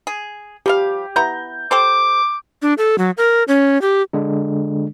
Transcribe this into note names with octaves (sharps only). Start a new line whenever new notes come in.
G#4
F3 G3 G4 F5
B3 E4 A#5 G6
G4 A4 C5 D6
D4
A4
F#3
A#4
C#4
G4
D3 G#3 D4